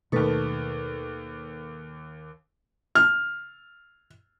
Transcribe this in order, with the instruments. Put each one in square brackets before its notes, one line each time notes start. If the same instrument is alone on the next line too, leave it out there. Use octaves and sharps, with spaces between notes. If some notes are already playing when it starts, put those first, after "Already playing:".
[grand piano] D#2 C#6 [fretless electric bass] B2 A3 [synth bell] D#4 A4 B4
[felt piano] F6